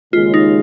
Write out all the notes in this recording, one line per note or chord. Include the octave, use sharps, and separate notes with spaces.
D#2 C#3 G#3 F4
D#4